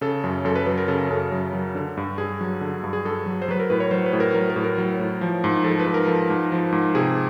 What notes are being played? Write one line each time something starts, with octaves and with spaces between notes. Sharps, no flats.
C#3 A4
F#2
F#2 A4
B4
F#3 B4
A#4
C#3 A4
F#2 A4
F#2
F#3
D3
G2
G2 G#4
F#3
D3
G2
G#4
G2 A4
F#3
C5
F#3 B4
A#4
A2 B4
C#5
F#3 C5
B4
A2
A#4
F#3 A#4
A#4
A2
A#4
F#3
A2
F3
G#2
F3 A4
B4
G#2
A#4
F3 A4
G#2
F3
G#2
C3 G#4